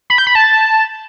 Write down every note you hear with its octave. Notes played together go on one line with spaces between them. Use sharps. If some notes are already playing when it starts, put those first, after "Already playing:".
B5
G6
B5
A5